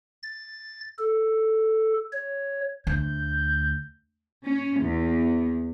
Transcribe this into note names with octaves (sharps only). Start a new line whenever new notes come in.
A6
A4
C#5
D2 G6
C#4
E2